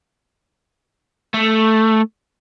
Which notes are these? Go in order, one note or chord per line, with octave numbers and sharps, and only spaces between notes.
A3